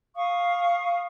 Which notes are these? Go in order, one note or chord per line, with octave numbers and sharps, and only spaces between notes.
F5 C#6 D#6